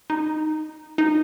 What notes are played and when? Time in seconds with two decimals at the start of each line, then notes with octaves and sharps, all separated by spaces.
0.10 D#4
0.98 D#4